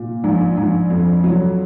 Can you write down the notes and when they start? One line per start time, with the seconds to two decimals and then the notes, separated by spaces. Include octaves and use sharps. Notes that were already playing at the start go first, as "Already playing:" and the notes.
Already playing: A#2
0.24 A#1
0.57 A#1
0.90 F2
1.24 F#3